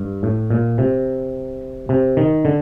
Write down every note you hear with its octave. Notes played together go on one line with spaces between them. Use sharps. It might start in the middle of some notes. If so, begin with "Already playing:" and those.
Already playing: G2
A2
A#2
C3
C3
D#3
D3